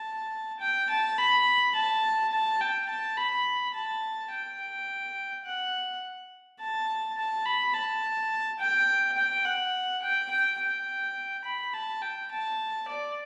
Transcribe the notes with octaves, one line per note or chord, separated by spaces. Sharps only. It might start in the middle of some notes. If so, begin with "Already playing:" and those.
Already playing: A5
G5
A5
B5
A5
A5
G5
A5
B5
A5
G5
F#5
A5
A5
B5
A5
G5
G5
F#5
G5
G5
G5
B5
A5
G5
A5
D5